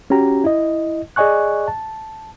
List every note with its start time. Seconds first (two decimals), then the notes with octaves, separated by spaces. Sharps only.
0.10 C#4 F#4 G4 A#5
0.44 E4 D#5
1.16 G#4 D5 D#5 G#5 C#6 F#6
1.68 A5